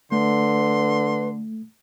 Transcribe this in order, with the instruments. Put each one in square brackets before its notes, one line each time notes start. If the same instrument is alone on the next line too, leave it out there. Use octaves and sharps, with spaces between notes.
[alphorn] D3 [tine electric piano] A3 [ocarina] B4 [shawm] C6